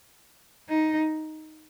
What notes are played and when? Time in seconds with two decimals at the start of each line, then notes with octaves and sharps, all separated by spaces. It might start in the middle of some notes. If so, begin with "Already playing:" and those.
0.70 D#4